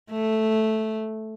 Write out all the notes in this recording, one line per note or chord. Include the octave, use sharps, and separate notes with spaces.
A3